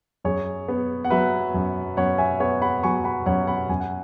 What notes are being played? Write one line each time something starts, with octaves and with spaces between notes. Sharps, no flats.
F#2 G#4 C#5
B3
F#5
F#3 B4 E5
F#2
F#2 C#5 F#5
E5 G#5
B3 C#5 F#5
F#5 B5
F#3 G#5 C#6
F#5 B5
F#2 C#5 F#5
F#5 B5
F#2 G#5
F#5